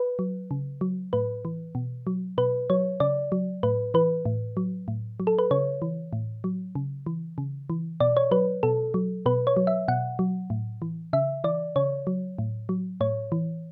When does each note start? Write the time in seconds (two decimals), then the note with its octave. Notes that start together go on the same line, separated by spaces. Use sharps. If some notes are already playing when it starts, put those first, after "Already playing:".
Already playing: B4
0.19 F#3
0.51 C#3
0.81 F#3
1.13 A2 B4
1.45 E3
1.75 B2
2.07 F#3
2.38 B2 B4
2.70 F#3 C#5
3.00 C#3 D5
3.32 F#3
3.63 A2 B4
3.94 E3 B4
4.25 A2
4.57 F#3
4.88 A2
5.20 F#3
5.27 A4
5.39 B4
5.51 C#3 C#5
5.82 E3
6.13 A2
6.44 F#3
6.75 C#3
7.06 E3
7.38 C#3
7.70 E3
8.00 B2 D5
8.17 C#5
8.31 F#3 B4
8.63 B2 A4
8.94 F#3
9.26 B2 B4
9.47 C#5
9.57 F#3
9.67 E5
9.88 B2 F#5
10.19 F#3
10.50 A2
10.82 E3
11.13 C#3 E5
11.44 E3 D5
11.76 C#3 C#5
12.07 F#3
12.39 A2
12.69 F#3
13.01 A2 C#5
13.32 E3